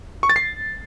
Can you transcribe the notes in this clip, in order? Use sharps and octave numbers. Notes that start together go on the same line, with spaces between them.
C#6
A6
C7